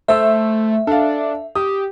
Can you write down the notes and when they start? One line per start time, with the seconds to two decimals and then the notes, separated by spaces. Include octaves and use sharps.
0.08 A3 C5 E5 E6
0.87 D4 A4 F5
1.55 G4 D#6